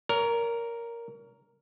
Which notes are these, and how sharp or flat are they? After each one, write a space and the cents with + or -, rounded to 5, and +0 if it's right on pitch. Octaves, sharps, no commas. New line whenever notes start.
A#4 +0 C#5 +35